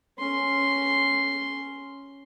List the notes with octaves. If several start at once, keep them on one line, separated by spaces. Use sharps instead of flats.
C#4 C6